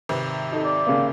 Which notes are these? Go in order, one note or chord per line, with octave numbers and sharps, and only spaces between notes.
G#1 C3 B4
D#4 A4
D5
C#3 A#3 F5